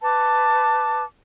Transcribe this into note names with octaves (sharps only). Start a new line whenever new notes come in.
B4 A5 D6